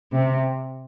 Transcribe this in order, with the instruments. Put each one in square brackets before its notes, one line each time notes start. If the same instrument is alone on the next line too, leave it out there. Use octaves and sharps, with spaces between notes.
[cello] C3